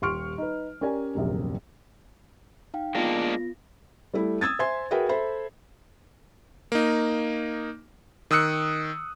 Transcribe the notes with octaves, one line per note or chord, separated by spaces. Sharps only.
D#1 G4 C6 C#6 F6 D7
D#4 B4
C#4 G4 A#4 D5 G#5
D#1 A#1 F#2 C3 A#3
D#4 F5 G5
G#3 A#3 B3 D4 F4 A#6
G3 A3 E4
D#6 E6 G#6 A6
C5 E5 G#5 C6 G#6
F#4 G#4 A#4 B4 E5 G5
A4 C5 E5 B5
A#3 D#4
D#3 D#6 E6 F#6 C#7